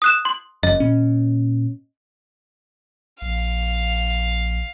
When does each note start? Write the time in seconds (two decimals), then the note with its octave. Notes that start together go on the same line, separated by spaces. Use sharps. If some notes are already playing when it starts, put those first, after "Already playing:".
0.02 D#6 F#6 E7
0.25 C6
0.63 F#1 F#2 D#5
0.80 A#2 C#4
3.22 A#1 F5